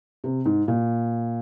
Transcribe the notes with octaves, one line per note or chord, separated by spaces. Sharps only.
C3
G#2
A#2